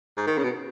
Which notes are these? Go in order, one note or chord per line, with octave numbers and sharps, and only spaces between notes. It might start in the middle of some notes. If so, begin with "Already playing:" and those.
G#2
D#3
C#3
B2